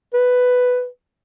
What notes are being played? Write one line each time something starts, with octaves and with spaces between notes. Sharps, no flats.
B4